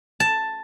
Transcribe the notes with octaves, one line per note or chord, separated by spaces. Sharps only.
A5